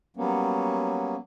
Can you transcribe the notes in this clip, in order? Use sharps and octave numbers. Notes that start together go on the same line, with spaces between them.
F#3 G3 A#3 B3 C#4